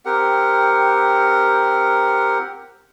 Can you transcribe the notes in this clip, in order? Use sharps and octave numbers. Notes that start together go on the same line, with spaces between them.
C4 G4 A#4 F#5